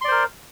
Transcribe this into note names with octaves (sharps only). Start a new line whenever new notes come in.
A#4 C5 D5 C6